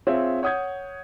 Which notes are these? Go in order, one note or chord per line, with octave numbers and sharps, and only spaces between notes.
C4 F4 G#4 C#5 E5
C#5 F#5 D#6 G6 G#6